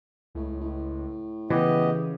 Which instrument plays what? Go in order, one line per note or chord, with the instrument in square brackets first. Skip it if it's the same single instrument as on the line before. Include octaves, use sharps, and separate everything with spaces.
[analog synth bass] C#2 [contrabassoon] A2
[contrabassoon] A2
[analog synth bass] C#3 [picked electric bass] E3 [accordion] B3 G4 D#5